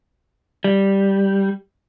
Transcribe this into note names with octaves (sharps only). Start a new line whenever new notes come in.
G3